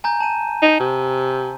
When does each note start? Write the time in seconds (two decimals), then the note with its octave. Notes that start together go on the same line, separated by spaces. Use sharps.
0.04 G#5 A#5 G6
0.20 A5 D#7
0.62 D#4
0.80 C3